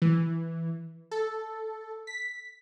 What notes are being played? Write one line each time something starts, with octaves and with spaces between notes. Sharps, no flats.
E3
A4
B6